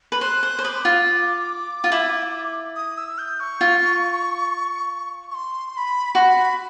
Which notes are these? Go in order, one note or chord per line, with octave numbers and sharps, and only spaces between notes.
B4
C5 F#6
C5
C5
B4 D6 D#6
F4
F4
E4
D#6
E6
G6
C#6
F4
C#6
C6
C6
B5
F#4 C6
B5